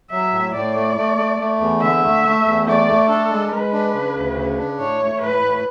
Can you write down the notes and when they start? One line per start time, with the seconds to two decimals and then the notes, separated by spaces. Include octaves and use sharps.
0.11 F#3 E5
0.32 A2
0.54 A2 D5
0.75 A3
0.97 A3
1.18 A3
1.39 A3
1.60 E2
1.81 D3 E5
2.03 A3
2.24 A3
2.46 E2
2.67 A3 D5
2.87 A3
3.09 D4 A4
3.30 G#3
3.51 G#3 B4
3.72 D4
3.94 C#3
4.15 D2
4.37 C#3
4.58 D4
4.80 A2 C#5
5.00 A3
5.21 A2 B4
5.43 A2